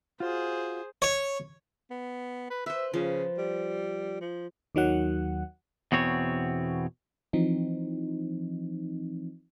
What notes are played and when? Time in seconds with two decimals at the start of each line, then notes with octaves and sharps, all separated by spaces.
0.20 F4 F#4 G#4 C5
1.02 C#5
1.90 B3
2.50 B4
2.66 B4 C5 E5
2.94 C#3 F3
3.38 G3
4.21 F3
4.75 D#2 D#3 F#3 F#5
5.92 E2 B2 C4 C#5
7.33 E3 F3 C4 D#4